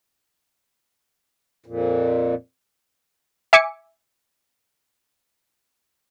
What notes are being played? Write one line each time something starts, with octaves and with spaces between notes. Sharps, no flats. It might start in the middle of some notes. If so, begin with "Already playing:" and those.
F2 A#2
E5 G#5 D6 C#7